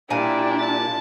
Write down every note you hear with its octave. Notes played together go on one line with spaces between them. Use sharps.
A#2 G3 D4 E4 G#5
A5